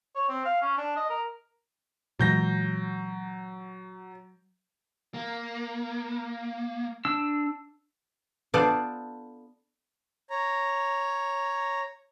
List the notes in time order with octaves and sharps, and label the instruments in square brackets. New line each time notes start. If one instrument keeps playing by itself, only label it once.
[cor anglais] C#5
C4
F5
C#4
D4
D#5
A#4
[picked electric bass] A#2 E3 G#3 [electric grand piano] F#3 G6 A#6
[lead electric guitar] A#3
[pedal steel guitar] D4 E6
[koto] B3 D4 F4 A4 C5 D5
[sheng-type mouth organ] C#5 A#5